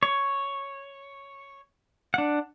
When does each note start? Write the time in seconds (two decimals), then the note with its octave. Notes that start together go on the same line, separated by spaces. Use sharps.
0.03 C#5
2.14 D4 F#5